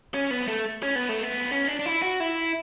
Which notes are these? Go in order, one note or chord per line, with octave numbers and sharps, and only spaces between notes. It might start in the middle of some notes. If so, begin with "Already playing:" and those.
C#4
B3
A3
C#4
B3
A3
B3
C#4
D4
D4
E4
F#4
E4